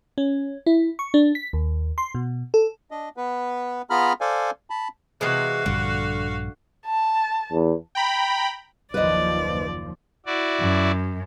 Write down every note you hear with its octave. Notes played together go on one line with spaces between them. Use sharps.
C#4
E4
C#6
D4
B6
D#2
C6
B2
A4
D4 D#5
B3 B4
B3 F4 G#4 A#5 B5 F6
A4 C5 D5 F5 G#5
A5 B5
C3 E3 G#3 F#4 F5
A#1 G2 D3 G3
A5
E2
G5 A#5 B5
F#1 D#2 F3 B4 C5 D5 D#5
E4 F#4 D5
F#2